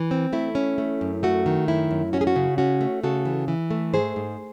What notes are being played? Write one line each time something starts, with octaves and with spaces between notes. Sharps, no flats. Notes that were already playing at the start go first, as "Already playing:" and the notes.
Already playing: E3
C4
A3 E4
C#4
A3
F#2
A3 F#4
D#3
F#2 E4
F#2
C#4 F#4
G#4
F#4
C#3
C#4 F#4
A3
C#3 F#4 A4
E3
E3
A3
G#2 G#4 C5
G#2